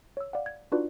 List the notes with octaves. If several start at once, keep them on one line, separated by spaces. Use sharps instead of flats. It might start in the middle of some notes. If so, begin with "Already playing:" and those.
C#5 E6
D5 F5 F#5
G#6
D4 D#4 F4 F#4 B4 D5